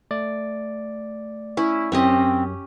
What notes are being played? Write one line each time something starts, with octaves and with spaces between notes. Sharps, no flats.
A3 D5
C#4 E4
F#2 C4 C#4 G4 D#5